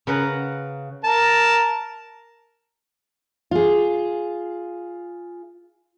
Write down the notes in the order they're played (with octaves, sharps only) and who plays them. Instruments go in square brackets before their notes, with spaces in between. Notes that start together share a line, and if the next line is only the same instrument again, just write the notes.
[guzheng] C#3 B4 F#5 A#5
[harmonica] A#4 A5
[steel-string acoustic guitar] F4 G#4